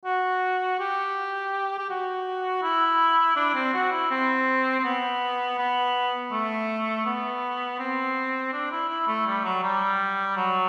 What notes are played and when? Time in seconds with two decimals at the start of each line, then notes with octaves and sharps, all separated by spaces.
0.05 F#4
0.79 G4
1.78 G4
1.90 F#4
2.63 E4
3.36 D4
3.55 C4
3.74 F#4
3.92 E4
4.10 C4
4.79 C4
4.84 B3
5.58 B3
6.32 A3
7.06 B3
7.79 C4
8.53 D4
8.71 E4
8.90 E4
9.07 A3
9.27 G3
9.44 F#3
9.64 G3
10.37 F#3